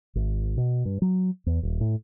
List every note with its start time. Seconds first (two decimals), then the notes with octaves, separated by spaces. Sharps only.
0.15 G#1
0.57 B2
0.85 G2
1.02 F#3
1.46 E2
1.63 D#1
1.81 A2